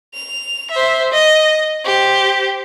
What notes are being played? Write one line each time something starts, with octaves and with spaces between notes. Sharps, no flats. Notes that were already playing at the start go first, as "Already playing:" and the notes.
F7
C5 E5
D#5
G4 C5